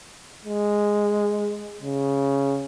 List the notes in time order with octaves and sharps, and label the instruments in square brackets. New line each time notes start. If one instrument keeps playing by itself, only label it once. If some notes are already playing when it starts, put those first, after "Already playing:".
[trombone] G#3
C#3